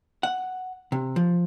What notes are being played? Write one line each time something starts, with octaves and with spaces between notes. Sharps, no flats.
F#5
C3
F3